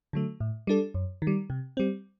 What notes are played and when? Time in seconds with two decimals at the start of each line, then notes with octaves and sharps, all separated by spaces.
0.13 D3 F#3 A3
0.40 A2
0.67 G3 D4 A4
0.94 F#2
1.22 D#3
1.27 G3
1.50 C3
1.77 G3 C4